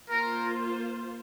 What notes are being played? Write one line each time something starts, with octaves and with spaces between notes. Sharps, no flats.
A#3 F4 A#4 C5